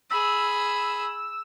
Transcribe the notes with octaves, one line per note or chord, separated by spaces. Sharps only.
G#4 B5 E6